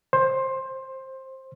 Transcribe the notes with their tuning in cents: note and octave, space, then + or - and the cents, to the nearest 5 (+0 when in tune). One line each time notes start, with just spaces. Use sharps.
C5 +15